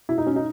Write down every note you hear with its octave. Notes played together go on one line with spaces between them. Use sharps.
B2 E4
D#4
C#4
D#4